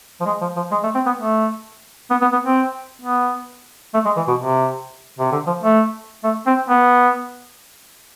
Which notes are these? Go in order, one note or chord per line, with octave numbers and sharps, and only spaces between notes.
F3
G#3
F3
F3
G#3
A3
C4
B3
A3
B3
B3
B3
C4
B3
A3
G#3
E3
B2
C3
C3
D3
F3
A3
A3
C4
B3